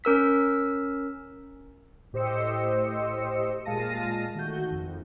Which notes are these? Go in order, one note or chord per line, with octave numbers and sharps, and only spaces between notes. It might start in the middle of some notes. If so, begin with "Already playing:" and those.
C#4 A#4 E6 B6
A2 G4 C5 D#5 E6 C#7
A#2 G#3 F5 A5 A#6 D#7
D#3 A3 F#4 G6
G#1 F2